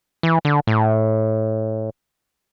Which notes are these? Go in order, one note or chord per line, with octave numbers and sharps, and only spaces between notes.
E3
D3
A2